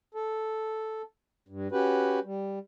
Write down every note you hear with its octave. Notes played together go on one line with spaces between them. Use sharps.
A4
G2
C#4 F#4 G4 B4
G3